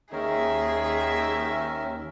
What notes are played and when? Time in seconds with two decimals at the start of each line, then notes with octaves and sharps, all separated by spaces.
0.12 D#2 G#2 D#3 C#4 D#4 G#4 A#4 E5